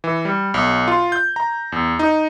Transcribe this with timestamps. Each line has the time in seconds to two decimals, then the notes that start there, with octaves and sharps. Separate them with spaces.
0.04 E3
0.25 G3
0.54 B1
0.88 F4
1.12 G6
1.36 A#5
1.72 E2
1.99 D#4